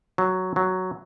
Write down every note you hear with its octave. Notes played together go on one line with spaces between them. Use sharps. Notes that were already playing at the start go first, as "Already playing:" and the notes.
F#3
F#3